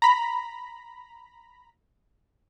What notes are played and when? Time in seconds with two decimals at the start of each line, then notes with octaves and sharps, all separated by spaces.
0.02 A#5 B5